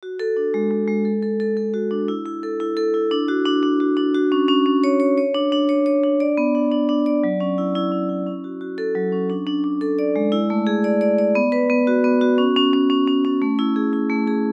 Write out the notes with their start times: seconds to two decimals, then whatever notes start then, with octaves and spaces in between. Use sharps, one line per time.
0.03 F#4
0.20 A4
0.37 D4
0.54 G#3
0.71 G#3
0.88 G#3
1.05 A4
1.23 A4
1.40 A4
1.57 A4
1.74 F#4
1.91 D4
2.08 E4
2.26 E4
2.43 A4
2.60 E4
2.77 A4
2.94 E4
3.11 D4
3.28 F#4
3.46 D4
3.63 D4
3.80 F#4
3.97 D4
4.14 F#4
4.32 C#4
4.48 C#4
4.66 C#4
4.84 C#5
5.00 C#5
5.18 C#5
5.35 D4
5.52 D4
5.69 C#5
5.86 C#5
6.03 D4
6.20 D5
6.37 B3
6.55 D4
6.72 D4
6.89 D4
7.06 D5
7.24 F#3
7.40 C#4
7.58 E4
7.75 E4
7.92 C#4
8.09 E4
8.26 C#4
8.44 F#4
8.61 F#4
8.78 A4
8.95 F#3
9.12 C#4
9.30 D4
9.47 D4
9.64 D4
9.81 A4
9.99 D5
10.16 G#3
10.32 E4
10.50 A3
10.67 G#4
10.84 D5
11.01 D5
11.18 D5
11.35 B3
11.52 B4
11.70 B3
11.87 F#4
12.04 B3
12.21 F#4
12.38 C#4
12.56 C#4
12.73 C#4
12.90 C#4
13.07 C#4
13.25 C#4
13.42 A3
13.59 E4
13.76 G#4
13.93 E4
14.10 A3
14.27 G#4